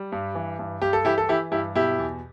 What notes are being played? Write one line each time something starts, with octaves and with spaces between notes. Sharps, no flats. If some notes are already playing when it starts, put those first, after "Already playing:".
Already playing: G3
G2
E3
G2
G2 G4
A4
E3 E4 G4
A4
E3 E4 G4
G2 E4 G4
B2 E4 G4
E2